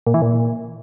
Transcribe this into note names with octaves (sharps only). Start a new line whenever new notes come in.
A#2
E3
A#2